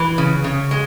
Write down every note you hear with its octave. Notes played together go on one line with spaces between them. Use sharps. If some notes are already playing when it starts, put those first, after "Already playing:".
Already playing: E3
C#3
C#3
G#3